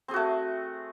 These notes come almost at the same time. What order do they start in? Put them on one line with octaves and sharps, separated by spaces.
C4 G#4 F#4 A3